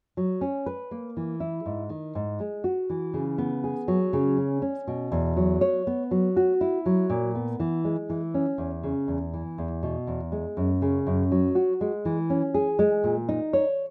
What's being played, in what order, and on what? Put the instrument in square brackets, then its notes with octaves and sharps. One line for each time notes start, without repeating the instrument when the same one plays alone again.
[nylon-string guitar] F#3
C#4
B4
A#3
E3
E4
G#2
D#3
G#2
G#3
F#4
E3
C#3
B3
G#4
F#3
C#3
C#4
C#4
B2
E2
F#3
C#5
B3
F#3
F#4
E4
F#3
A#2
B3
E3
G#3
E3
C#4
E2
C#3
E2
E3
E2
B2
E2
G#3
F#2
C#3
F#2
F#3
F#4
G#3
E3
C#4
G#4
G#3
A#2
D#4
C#5